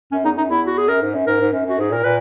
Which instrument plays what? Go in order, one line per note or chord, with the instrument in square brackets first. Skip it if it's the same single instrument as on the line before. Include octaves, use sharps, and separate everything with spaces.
[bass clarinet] F#2 [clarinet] C#4
[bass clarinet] E2 [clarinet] D#4
[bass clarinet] F#2 [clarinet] D#4
[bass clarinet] E2 [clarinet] E4
[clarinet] F#4
G#4
[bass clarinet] F#2 [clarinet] A#4
[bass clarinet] G#2
F#2
[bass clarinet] G#2 [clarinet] A#4
[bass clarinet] G#2
F#2
[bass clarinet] F#2 [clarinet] F#4
[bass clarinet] G#2 [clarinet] G#4
[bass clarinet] A#2 [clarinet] A#4
[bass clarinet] A#2 [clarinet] B4